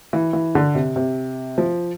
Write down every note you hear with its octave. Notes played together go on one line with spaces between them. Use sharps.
E3
E3
D3
C3
C3
F3